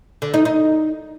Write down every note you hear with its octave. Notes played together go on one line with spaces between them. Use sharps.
D3
D#4
D#4